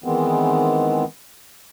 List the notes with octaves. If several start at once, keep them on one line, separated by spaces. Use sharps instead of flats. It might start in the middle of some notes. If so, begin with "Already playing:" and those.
D#3 E3 G#3 B3 C4